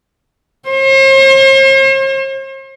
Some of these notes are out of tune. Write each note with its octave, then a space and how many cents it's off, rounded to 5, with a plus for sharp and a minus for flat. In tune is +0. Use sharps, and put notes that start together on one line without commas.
C5 +45